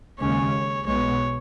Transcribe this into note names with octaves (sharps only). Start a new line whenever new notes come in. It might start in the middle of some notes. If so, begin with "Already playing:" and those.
D#2 C#3 G#3 C#4 C#5
B1 B2 G#3 B3 C#5